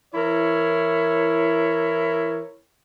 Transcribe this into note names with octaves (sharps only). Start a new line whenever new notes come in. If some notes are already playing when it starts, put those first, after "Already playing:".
E3 E4 A#4 C#5